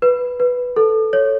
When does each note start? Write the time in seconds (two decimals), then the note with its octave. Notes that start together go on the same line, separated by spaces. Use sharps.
0.02 B4
0.40 B4
0.76 A4
1.13 C#5